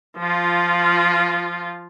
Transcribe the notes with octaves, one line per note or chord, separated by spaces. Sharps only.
F3 F4